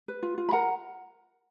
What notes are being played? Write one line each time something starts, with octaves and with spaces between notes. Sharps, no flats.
B4
F4
F4
B5
A#4 F#5 A#5